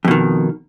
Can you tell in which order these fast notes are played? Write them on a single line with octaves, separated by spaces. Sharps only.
F2 B2 D#3